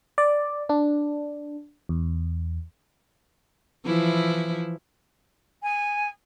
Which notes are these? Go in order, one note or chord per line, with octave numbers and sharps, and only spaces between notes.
D5
D4
E2
E3 F3 E4
G#5